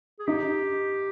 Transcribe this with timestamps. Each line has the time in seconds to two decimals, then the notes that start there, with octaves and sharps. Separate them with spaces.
0.19 G#4
0.27 D#4 G4